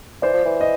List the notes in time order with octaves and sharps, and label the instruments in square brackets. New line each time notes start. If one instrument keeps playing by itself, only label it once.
[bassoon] E3 [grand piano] C5 D5
[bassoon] F3
E3
[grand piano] D#5